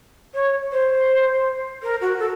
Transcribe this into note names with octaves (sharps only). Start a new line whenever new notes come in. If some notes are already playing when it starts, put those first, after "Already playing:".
C#5
C5
A#4
F#4
A4